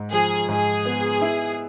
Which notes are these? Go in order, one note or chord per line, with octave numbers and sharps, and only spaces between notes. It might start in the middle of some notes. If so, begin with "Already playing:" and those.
Already playing: G#2
F3 G#4
G#2 G#4
B3
E4